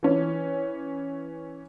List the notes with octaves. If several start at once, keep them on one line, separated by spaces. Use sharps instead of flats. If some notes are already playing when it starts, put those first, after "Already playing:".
E3 C#4